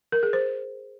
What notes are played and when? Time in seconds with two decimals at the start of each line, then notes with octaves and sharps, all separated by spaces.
0.12 A#4
0.23 G#4
0.33 C5